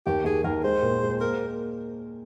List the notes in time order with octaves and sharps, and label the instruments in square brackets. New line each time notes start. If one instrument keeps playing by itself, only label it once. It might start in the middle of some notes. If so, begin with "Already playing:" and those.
[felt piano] D#2 [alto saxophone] G4
[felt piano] D#2 [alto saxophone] G#4
[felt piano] D#2 [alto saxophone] A#4
[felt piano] G#3 [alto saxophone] C5
[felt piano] A#2
G#3
[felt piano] A#3 [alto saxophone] A#4